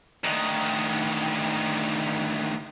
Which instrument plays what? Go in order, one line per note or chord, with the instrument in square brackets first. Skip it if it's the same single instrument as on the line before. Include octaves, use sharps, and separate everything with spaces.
[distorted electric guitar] D2 D#3